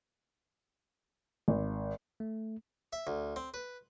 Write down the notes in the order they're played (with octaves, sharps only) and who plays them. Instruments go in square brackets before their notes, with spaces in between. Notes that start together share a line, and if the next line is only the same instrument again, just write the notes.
[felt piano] G#1
[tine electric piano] A3
[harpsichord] E5
D2
C4
B4